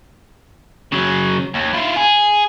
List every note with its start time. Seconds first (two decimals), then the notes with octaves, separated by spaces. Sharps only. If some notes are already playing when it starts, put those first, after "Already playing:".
0.92 C#3 F#3
1.54 D#2
1.73 E4 F4
1.96 G#4